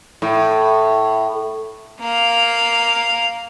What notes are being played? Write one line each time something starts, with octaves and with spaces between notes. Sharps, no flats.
A2
A#3 F5